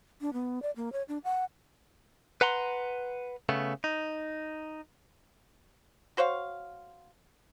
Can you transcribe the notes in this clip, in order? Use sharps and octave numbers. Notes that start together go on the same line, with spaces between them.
D4
B3
D5
A#3
C#5
D4
F#5
B4 F#5 A#5 C6
C#3 A3 B3
D#4
F#4 C5 C#5 F5